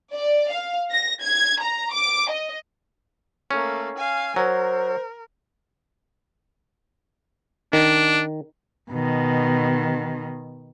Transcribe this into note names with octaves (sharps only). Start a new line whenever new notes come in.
D5
F5
A#6
G#6
A#5
D6
D#5
A3 A#3 C#4
F5 G#5
F#3 A#4 C5
D#3 D4
B2 D#3